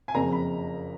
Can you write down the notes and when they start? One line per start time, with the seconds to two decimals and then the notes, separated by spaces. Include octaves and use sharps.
0.08 G#5
0.15 F#1 F2 C#3 A#5
0.32 B5